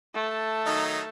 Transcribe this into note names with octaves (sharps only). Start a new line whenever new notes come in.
A3 A5
D#3 F#3 D#4